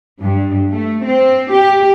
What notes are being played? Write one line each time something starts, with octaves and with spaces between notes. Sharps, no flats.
G2
A3
C4
G4